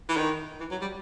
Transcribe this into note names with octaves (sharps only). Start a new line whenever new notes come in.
E3
D#3
E3
F#3
G3